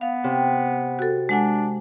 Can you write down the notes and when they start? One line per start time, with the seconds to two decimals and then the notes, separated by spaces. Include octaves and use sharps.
0.01 B3 F5
0.24 C3
0.99 F#4 A4
1.29 G#3 D4 F#5 G#5